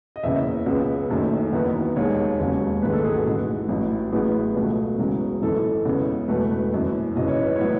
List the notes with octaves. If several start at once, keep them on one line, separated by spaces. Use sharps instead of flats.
D#5
F#1 E2 C#3 E5
C#2 C#3 G#3 B3
F#1 F#2 D#3 A3
F#1 E2 D#3 F#3 B3
E1 D#2 D#3 G#3 C#5
E1 D#2 C#3 F#3
A1 G#2 D#3 G#3 B4
A4
G#4
F#4
A1 G#2 E3 A3
A1 A2 F#3
A1 A2 F#3 B3 G#4
C#2 B2 A3
E1 E2 C#3 F#3
G#1 F#2 E3 A4
E2 C#3 G#3 B3
E1 E2 B2 A3 B4
F#1 F#2 E3
G#1 F#2 C#3 E3 D#5
C#5
B4
A2 F#3 B3 C#5